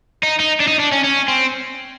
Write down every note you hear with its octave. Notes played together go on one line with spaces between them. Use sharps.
D#4
D#4
D4
D#4
D4
C#4
C#4
C4